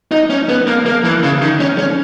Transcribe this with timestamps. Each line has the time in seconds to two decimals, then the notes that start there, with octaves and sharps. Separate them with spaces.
0.12 D#4
0.30 C#4
0.49 B3
0.67 A#3
0.86 A#3
1.04 E3
1.23 C#3
1.42 D#3
1.60 C#4
1.78 C#4